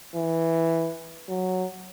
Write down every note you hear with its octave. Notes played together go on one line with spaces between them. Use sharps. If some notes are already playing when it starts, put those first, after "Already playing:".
E3
F#3